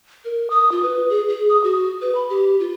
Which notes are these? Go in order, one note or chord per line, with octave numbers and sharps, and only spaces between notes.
A#4
D#6
F4
B4
G#4
G#4
D#6
F#4
B4
B5
G4
F4